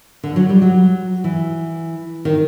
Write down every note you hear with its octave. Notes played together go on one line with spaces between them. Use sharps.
D3
F#3
G3
F#3
E3
D#3